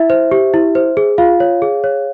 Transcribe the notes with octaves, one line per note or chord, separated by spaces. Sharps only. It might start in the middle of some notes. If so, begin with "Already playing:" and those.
Already playing: E4 E5
C5
G4
E4
C5
G#4
F4 F5
C#5
G#4
C#5